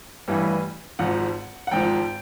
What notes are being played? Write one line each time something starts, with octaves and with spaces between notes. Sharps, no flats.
A1 G2 E3 G3
G#1 G#2 F3 F#5
F#5
G#1 G#2 F3 G5